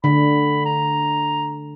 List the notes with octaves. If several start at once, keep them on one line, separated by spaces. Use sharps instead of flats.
D3 B5
A#5